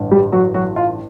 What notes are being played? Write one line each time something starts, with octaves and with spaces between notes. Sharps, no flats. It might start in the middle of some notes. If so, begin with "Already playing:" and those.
Already playing: A1 G2 D3
G3 G4
F#3 F#4
F#3 F#4
F4